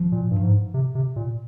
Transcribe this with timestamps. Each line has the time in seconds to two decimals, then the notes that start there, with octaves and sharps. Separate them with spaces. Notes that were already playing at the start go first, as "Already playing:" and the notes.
Already playing: F3
0.12 A#2
0.31 G2
0.43 G#2
0.74 C3
0.95 C3
1.16 A#2